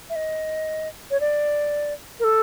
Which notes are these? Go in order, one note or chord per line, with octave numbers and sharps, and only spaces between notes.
E5
D#5
C#5
D5
A#4
A4